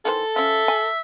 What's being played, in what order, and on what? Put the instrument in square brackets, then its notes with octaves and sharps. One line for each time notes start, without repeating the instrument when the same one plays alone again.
[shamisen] D#3 E3 C5 [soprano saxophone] A4
[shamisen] F3 C#4 [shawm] E5
[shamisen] G#5